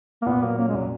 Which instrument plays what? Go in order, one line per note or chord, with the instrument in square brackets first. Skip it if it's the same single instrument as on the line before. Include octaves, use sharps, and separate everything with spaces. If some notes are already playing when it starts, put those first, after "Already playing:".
[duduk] A#3
[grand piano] A#2 [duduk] B3
[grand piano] F#3 [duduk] A#3
[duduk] A#3 [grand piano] C#4
[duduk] G#3
[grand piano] A#2 [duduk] F#3